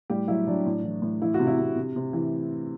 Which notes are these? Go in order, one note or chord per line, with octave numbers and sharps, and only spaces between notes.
A2 G3 G4
F#3 E4
F#3 D4
A2
E3
A2
E3 E4
C3 F#4
E4
C3
C3
C3
E3